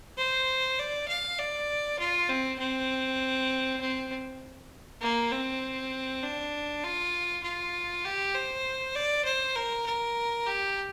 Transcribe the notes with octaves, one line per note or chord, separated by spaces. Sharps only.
C5
D5
F5
D5
F4
C4
C4
C4
A#3
C4
D4
F4
F4
G4
C5
D5
C5
A#4
A#4
G4